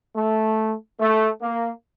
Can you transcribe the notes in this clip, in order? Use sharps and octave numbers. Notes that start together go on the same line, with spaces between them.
A3
A3
A#3